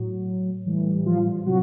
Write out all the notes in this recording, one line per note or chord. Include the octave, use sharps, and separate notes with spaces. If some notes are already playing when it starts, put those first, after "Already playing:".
Already playing: A2 F#3
A2 E3 G3
F3 F4
C3 F#3 F#4